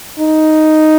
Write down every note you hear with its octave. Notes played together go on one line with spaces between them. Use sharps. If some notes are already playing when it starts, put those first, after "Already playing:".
D#4